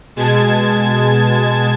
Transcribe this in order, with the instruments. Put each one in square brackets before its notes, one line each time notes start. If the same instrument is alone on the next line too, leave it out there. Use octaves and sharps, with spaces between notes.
[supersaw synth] B2 G#3 A5 G#6